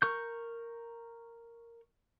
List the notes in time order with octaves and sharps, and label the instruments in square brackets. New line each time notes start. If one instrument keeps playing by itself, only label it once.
[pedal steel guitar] A#4 C#6 G6